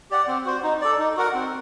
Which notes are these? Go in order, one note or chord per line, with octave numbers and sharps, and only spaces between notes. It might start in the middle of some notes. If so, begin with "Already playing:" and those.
G4 D5 F#5
C4
F#4 C5
D#4
A4 D5
D#4
F#4 A#4 F#5
C4